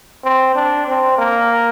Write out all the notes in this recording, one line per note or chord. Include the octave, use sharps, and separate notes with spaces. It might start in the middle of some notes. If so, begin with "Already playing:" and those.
C4
D4
C4
A#3